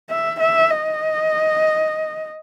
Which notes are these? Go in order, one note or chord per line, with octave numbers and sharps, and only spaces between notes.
E5
E5
D#5